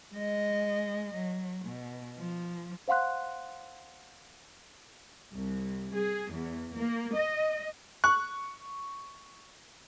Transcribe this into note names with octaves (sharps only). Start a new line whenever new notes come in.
G#3 D#5
F#3
B2
F3
C5 F5 F#5 C6 F#6
C2
G#4
E2
A#3
D#5
C#6 F#6